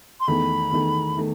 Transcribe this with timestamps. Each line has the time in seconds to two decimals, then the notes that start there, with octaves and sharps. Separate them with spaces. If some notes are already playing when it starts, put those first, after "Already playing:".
0.20 C6
0.28 E2 D#3 A3 B5
0.71 E2 D#3 A3
1.17 D#3 A3